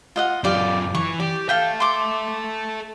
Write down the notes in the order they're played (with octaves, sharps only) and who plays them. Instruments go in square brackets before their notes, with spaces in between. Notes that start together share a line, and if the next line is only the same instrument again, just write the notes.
[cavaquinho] F4 D#5 F#5
[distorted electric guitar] F#2 F4 [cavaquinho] G4 D5 F5
[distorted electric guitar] E3 [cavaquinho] C#6
[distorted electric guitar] G4 [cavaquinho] D5
[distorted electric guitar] A4 E5 [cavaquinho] F5 G5
[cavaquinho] C6 D6